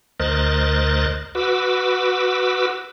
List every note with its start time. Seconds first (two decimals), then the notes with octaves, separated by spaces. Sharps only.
0.20 D2 A#4 C5 D#5 F#6 A6
1.35 F#4 B4 D6 E6